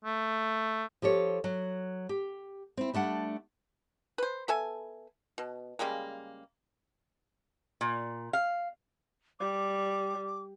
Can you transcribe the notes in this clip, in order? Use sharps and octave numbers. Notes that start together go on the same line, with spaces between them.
A3
F3 G4 A4 C#5
F#3
G4
C4 E4
G3 A3 D4 F#5
B4 C5
B3 A4 E5 G#5
B2
C#3 G3 G#3 A#3
A#2
F5
G3 D6